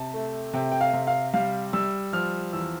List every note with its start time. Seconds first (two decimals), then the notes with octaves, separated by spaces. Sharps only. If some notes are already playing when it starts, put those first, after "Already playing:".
Already playing: C3 A5
0.14 A3
0.54 C3 G5
0.72 G5
0.81 F5
0.93 C3
1.07 F5
1.34 G3 F5
1.73 G3 E6
2.13 F3 F6
2.53 E2 E6